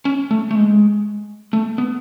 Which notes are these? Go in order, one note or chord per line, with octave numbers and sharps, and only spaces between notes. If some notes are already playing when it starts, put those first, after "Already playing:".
C#4
A3
A3
G#3
A3
B3